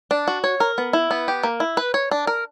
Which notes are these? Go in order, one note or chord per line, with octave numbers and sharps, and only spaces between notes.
D4
F#4
C#5
A#4
B3
E4
B3
G4
A#3
E4
B4
C#5
D4
A#4